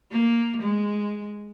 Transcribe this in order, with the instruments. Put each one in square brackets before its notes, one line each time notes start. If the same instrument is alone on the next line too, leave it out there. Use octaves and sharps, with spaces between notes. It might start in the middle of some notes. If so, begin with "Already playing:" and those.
[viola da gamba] A#3
G#3